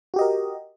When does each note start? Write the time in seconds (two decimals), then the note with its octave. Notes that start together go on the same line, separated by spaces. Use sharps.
0.14 F#4
0.16 G4
0.19 D#5
0.21 A#4